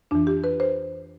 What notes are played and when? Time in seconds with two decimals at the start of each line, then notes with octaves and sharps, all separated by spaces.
0.11 F2 E3 D4
0.27 G4
0.44 B4
0.60 C5